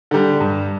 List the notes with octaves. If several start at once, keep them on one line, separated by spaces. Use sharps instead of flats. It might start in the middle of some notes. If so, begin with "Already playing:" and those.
D3 G3
G2